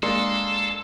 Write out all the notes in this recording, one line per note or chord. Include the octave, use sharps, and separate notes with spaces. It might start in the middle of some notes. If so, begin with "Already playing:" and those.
G#3 A#3 D4 A4 C6